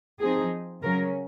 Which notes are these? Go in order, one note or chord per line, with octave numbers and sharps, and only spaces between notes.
F3 C4 D#4 G#4
C#3 F#3 C#4 A#4